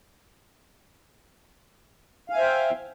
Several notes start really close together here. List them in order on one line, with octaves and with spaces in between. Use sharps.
F5 G#5 E5 C5 G5